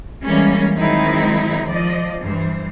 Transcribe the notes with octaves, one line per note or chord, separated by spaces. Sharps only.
E3 G3 G#3 A#3 C#4
D#3 F#3 G#3 C4 D#4 E4
F3 D5 D#5
G2 E3 C5